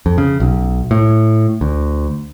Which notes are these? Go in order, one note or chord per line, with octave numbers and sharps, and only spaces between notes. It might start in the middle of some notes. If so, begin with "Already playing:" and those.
F2
C#3
B1
A2
D2